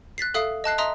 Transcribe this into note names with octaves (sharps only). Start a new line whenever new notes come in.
F#6 A6 B6 C7
A4 E5 F5 D#6 C7
D#5 A5 F#6 C7
D#5 E5 A#5 C6 D#6